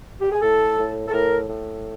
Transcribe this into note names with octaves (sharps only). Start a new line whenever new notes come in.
G4
G#4
A2 A4
A2
A4
A2 A#4
A2